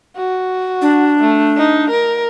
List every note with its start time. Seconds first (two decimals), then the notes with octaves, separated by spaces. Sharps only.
0.17 F#4
0.82 D4
1.21 A3
1.57 D#4
1.91 A#4